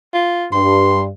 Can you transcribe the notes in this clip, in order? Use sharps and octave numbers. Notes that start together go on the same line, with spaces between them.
F4
G2 C6